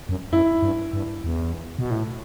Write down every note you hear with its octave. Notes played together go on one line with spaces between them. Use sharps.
F#2
F#2 E4
G2
G2
E2
B2
A2